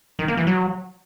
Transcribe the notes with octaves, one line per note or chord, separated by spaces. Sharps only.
D#3
A#3
E3
F#3